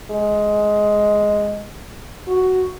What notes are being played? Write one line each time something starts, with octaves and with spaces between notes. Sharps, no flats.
G#3
F#4